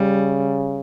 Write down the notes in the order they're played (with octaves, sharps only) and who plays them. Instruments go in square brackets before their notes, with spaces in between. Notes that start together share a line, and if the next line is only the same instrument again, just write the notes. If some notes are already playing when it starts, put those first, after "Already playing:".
Already playing: [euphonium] C#3 [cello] G3